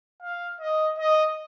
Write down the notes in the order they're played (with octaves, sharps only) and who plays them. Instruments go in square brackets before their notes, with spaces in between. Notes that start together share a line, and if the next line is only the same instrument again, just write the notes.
[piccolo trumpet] F5
D#5
D#5